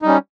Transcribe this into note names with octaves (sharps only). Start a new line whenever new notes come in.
G3 C#4 D#4